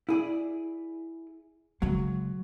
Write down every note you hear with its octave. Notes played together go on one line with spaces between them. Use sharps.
E4 G#4 D5
C#3 F#3 G#3